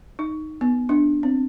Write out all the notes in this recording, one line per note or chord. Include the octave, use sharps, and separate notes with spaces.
D#4
B3
D4
C4